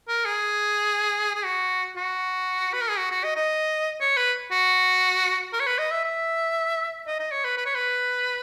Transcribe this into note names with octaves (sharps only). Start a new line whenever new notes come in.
A#4
G#4
G#4
F#4
F#4
B4
A#4
G#4
F#4
F#4
D#5
D#5
C#5
B4
F#4
A#4
C#5
B4
D#5
E5
E5
D#5
D#5
C#5
B4
B4
C#5
B4